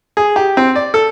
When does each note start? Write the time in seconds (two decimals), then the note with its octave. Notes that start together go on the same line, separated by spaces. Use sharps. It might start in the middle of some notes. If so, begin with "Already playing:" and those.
0.17 G#4
0.36 G4
0.57 C4
0.76 D5
0.94 A4